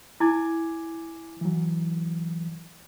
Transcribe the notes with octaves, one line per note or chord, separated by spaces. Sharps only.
E4 G#5 D6 G#6
E3 F#3